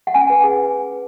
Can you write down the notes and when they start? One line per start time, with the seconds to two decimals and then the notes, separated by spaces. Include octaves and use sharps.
0.07 F#5
0.14 C#4 G#5
0.30 B4
0.44 G#4